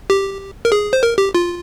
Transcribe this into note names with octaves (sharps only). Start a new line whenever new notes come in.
G4
A#4
G#4
C5
A#4
G4
F4